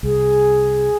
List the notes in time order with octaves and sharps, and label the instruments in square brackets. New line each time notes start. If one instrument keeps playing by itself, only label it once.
[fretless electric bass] C2 [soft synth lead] G#4